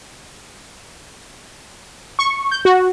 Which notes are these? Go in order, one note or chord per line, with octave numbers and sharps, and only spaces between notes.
C#6
G6
F#4